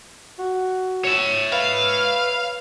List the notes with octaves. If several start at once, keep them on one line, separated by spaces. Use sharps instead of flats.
F#4
C#5 E5
B4 F5